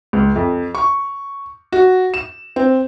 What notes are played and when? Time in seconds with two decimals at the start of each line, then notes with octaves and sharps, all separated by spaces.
0.13 C#2
0.36 F2
0.75 C#6
1.72 F#4
2.14 E7
2.56 C4